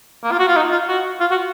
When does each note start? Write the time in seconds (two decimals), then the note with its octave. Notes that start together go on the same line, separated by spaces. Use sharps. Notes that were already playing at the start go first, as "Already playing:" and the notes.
0.24 A#3
0.32 F4
0.39 F#4
0.48 F4
0.56 D#4
0.72 F4
0.88 F#4
1.20 F4
1.31 F#4